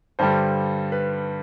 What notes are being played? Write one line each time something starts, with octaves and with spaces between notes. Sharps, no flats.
G2 D3 G3 C5
B4